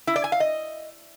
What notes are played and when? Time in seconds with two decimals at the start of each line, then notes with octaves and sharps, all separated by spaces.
0.07 E4
0.16 D5
0.24 G#5
0.32 F5
0.40 D#5